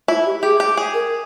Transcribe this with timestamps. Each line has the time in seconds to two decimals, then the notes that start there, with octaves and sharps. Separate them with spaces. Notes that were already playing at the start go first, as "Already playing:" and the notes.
0.08 E4 F4
0.26 G4
0.42 G4 G#4
0.60 G4
0.77 G#4
0.94 A#4